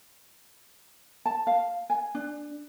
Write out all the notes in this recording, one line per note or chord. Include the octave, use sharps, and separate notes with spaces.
A5
F5
G#5
D4